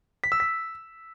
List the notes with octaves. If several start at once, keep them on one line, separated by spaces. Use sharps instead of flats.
B6
E6
B6